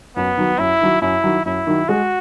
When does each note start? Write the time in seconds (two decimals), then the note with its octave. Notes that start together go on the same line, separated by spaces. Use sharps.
0.16 F#2 B3
0.37 D#3 F#3
0.59 F#2 E4
0.81 D#3 F#3
1.02 F#2 E4
1.24 D#3 F#3
1.46 F#2 E4
1.67 D#3 F#3
1.89 G#3 F#4